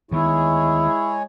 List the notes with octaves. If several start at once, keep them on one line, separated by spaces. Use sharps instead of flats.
D2 D#3 G#3 B3 E4 G#4 C#5